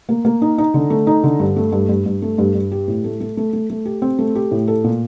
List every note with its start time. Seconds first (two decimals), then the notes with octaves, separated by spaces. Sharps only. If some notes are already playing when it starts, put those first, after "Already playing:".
0.09 A#3
0.25 A#3
0.42 D#4
0.58 D#4
0.74 D3
0.90 A3
1.07 D#4
1.24 D3
1.39 G2
1.56 A3
1.72 G2
1.89 G2
2.06 G2
2.22 A3
2.38 G2
2.55 G2
2.72 G4
2.88 A2
3.04 A3
3.20 A3
3.37 A3
3.53 A3
3.70 A3
3.86 G4
4.02 C4
4.19 A3
4.35 G4
4.51 A2
4.68 A4
4.84 A#2